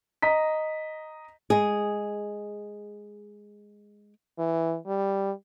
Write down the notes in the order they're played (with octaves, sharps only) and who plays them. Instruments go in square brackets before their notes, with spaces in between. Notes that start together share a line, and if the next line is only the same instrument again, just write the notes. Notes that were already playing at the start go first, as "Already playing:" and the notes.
[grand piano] D#5 A#5 B6
[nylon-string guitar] G#3 G#4
[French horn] E3
G3